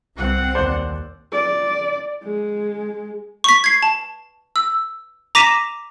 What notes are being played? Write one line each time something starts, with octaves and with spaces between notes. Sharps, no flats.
C2 C4 F#5
D#2 C5 D5
D5
G#3
C#6 B6
G#6 C7
A5
E6
A#5 D6 A#6 B6 D#7 E7